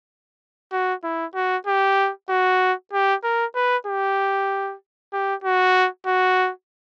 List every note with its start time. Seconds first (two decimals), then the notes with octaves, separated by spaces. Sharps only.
0.72 F#4
1.03 E4
1.35 F#4
1.67 G4
2.29 F#4
2.93 G4
3.23 A#4
3.55 B4
3.87 G4
5.13 G4
5.44 F#4
6.06 F#4